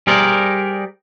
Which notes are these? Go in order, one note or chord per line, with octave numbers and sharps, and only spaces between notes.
G3 G#4 A#4 C5 D5